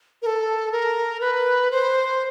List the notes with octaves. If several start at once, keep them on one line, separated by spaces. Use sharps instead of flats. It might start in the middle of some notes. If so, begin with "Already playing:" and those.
A#4
A4
A#4
B4
C5